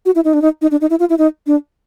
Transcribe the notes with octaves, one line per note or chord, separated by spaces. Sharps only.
F#4
E4
D#4
D4
D#4
D#4
D4
D#4
E4
F4
E4
D#4
D4